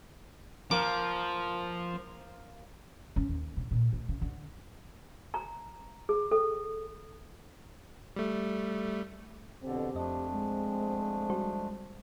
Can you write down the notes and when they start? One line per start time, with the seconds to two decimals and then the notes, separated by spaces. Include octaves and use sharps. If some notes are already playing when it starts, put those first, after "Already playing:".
0.71 F3 A#3 A#4 D6
3.16 C#4
3.29 D#2
3.57 C3
3.71 A#2
3.93 D2
4.08 C#3
4.21 D3
5.34 A#5
6.09 G#4
6.31 A4
8.16 G3 A3
9.63 F2 B2 D3 C4 G4
9.95 F2 F3 A3 D4 D#5
10.32 G#3
11.30 G3 F#4 C5